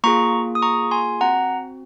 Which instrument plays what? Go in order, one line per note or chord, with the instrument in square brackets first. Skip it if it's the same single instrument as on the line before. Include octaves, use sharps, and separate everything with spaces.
[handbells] A#3 F4 G#4 A#5 C#6
D#6
A#5 C#6
G#5 C6
C4 F#4 F#5 A#5